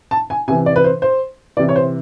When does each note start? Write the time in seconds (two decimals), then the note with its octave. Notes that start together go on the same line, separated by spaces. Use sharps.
0.11 A5
0.30 G#5
0.48 C3 G#5
0.51 E3
0.66 D5
0.76 B4
0.84 C5
1.02 C5
1.57 C3 E3 D5
1.69 C#5
1.76 C5